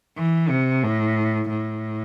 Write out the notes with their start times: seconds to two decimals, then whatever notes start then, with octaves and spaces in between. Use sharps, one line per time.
0.17 E3
0.49 C3
0.83 A2
1.49 A2